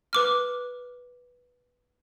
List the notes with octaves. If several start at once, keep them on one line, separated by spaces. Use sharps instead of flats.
B4 D6 F6